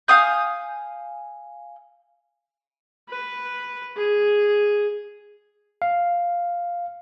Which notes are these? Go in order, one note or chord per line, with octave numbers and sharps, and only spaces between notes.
F5 G#5 D#6 G6
B4
G#4
F5